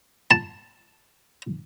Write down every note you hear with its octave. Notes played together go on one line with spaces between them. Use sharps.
A5